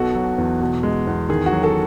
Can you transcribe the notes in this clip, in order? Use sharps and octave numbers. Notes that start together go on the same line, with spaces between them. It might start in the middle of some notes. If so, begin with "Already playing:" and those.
Already playing: B1 B2 F#4 A4
F#3
E2
B2
G#3
E2
D#3 G#4
F#4
F#3
F#4 A4